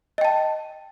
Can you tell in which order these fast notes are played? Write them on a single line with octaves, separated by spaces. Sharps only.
D#5 G5 A5